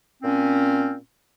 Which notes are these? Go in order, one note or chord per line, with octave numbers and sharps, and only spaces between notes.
A#2 C4 C#4